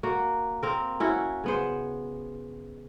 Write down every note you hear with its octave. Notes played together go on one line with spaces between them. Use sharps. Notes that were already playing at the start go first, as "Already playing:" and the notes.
A#3 F#4
A#3 C4 A#4
C#4 E4 F#4
C#3 B3 C5